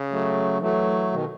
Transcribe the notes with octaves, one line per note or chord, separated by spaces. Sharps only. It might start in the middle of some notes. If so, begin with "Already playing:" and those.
Already playing: C#3
F#3 A3
E3 F#3 A3
B2 D#3